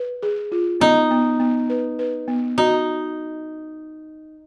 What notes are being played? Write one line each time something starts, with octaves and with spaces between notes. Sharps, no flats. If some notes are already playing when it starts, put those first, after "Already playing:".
Already playing: B4
G#4
F4
B3 D#4
B3
B3
B4
B4
B3
D#4 F#4